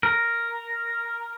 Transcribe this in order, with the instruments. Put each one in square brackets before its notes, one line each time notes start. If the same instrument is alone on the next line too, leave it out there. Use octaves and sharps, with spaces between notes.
[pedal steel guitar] A#4